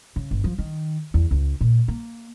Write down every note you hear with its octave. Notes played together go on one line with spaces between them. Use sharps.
C#3
G1
F3
D#3
E2
C#2
A#2
A#3